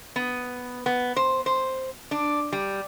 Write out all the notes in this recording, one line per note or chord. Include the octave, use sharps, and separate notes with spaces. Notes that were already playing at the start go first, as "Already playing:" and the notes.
B3
B3
C5
C5
D4
G3